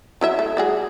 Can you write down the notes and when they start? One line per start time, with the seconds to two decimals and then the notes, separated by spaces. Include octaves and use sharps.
0.21 F#3 E4 E5
0.39 A3
0.57 G3 F#4 G#4